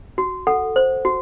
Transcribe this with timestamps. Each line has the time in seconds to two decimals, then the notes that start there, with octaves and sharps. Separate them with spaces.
0.18 F#4
0.47 A4 F#5
0.76 C5
1.05 F#4